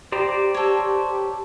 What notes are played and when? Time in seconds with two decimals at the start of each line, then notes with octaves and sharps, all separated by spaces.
0.12 G4 C5 D5 A#5
0.54 A4 C#5